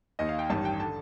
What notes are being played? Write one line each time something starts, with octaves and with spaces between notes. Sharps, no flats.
D#2 D#3 D#5
F5
G5
A1 G2 D#3 A5
G5
D3 A5